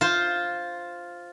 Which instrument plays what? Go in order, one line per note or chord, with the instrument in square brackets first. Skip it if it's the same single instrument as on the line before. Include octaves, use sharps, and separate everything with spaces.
[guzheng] F4 C5